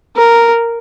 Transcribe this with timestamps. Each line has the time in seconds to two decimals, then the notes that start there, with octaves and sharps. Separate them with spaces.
0.16 A#4